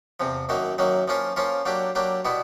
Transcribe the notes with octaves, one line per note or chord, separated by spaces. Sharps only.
E2 C3 F3
F#2 D#3 F#3 A#3
F#2 D#3 F#3 A#3
F3 A#3 C#4 F4
F3 A#3 C#4 F4
F#3 A#3 D4 G4
F#3 A#3 D4 G4
B2 G3 B3 E4